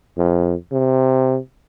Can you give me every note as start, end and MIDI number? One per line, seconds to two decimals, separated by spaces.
0.18 0.54 41
0.72 1.38 48